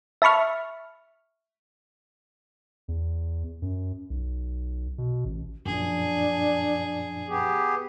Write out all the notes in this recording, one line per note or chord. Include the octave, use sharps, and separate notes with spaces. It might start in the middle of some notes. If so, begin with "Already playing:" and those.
E5 A5 B5 C#6 F6
E2
F#2
B1
B2
A1
F#2 A#2 F3 D4 G#4
B3 G4 G#4